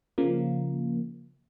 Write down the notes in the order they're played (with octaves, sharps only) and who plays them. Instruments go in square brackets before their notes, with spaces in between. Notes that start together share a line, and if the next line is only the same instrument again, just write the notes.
[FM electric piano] C#3 F3 A#3